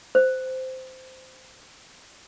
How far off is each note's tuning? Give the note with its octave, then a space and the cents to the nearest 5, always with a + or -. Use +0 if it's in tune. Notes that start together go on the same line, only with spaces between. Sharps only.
C5 -10